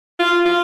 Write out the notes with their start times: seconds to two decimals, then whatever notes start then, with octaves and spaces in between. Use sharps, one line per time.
0.19 F4
0.46 F4